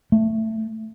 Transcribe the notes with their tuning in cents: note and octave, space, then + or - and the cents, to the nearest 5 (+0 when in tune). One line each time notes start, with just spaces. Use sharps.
A3 +10